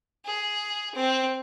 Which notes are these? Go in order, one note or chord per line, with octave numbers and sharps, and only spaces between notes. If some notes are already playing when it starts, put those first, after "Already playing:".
G#4
C4